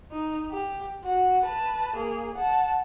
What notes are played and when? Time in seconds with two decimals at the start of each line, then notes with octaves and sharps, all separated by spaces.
0.12 D#4
0.51 G4
1.04 F#4
1.45 B4 A5
1.96 A#3 G#4
2.35 F#5 A5